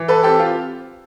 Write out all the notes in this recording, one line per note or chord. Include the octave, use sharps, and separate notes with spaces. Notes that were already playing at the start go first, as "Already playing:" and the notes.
Already playing: E3
A4 B4
C4 G4 A4
F4 G4